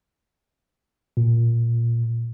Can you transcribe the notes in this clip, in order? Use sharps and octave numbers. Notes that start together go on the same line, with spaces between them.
A#2